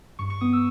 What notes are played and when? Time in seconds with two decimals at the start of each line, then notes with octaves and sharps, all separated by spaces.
0.19 G2 C#6
0.30 C#6
0.41 B3 D#6
0.53 E6